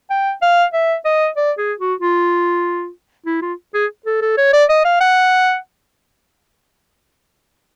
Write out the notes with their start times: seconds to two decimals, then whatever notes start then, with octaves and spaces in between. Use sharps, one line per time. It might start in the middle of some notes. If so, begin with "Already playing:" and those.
0.10 G5
0.42 F5
0.73 E5
1.05 D#5
1.37 D5
1.58 G#4
1.79 F#4
2.00 F4
3.26 E4
3.42 F4
3.74 G#4
4.06 A4
4.22 A4
4.38 C#5
4.53 D5
4.69 D#5
4.85 F5
5.01 F#5